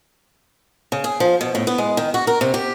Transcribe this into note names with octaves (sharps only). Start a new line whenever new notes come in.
C#3
G#4
F3
B2
A2
B3
G#3
D#3
F#4
A#4
C3
G4